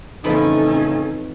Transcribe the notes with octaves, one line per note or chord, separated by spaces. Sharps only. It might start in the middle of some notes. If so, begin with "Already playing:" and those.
F2 A2 C#3 E3 C#4 D#4 A4 B5